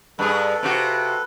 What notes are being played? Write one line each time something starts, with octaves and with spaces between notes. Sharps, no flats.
G2 G#4 A4 B4
C3 F4 F#4